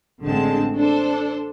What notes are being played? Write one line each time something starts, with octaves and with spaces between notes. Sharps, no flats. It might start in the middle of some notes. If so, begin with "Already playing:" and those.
A1 D3 G#3 C4 A5
D4 A4 C5